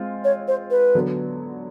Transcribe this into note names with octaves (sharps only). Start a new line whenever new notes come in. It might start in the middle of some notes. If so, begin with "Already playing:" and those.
Already playing: G#3 C4 F4
C#5
C5
B4
D3 F#3 B3